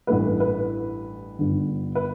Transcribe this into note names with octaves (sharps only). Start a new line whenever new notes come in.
A1 G2 E3 A3 B4
B4
G1 G2 D3
B4